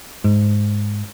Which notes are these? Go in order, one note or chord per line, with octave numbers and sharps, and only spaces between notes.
G#2